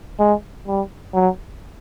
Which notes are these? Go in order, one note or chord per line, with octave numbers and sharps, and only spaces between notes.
G#3
G3
F#3